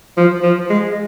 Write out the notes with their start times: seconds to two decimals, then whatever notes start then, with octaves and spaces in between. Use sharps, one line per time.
0.17 F3
0.43 F3
0.70 G#3